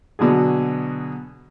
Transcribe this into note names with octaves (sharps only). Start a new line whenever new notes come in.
B2 D3 F#3 G#4